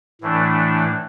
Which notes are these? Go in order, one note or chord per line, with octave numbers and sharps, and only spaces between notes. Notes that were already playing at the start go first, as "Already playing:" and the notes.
A2 E3 A3 D4